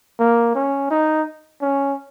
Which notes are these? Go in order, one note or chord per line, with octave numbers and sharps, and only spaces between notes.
A#3
C#4
D#4
C#4